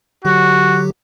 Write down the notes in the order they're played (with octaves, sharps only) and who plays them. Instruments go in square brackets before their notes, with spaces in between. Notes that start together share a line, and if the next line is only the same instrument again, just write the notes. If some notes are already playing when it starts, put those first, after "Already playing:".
[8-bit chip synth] D3 F#3 G4 [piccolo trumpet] F#4